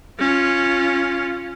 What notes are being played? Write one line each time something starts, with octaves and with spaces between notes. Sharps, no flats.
C#4 F4